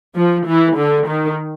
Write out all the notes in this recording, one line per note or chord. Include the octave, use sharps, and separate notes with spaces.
F3
E3
D3
D#3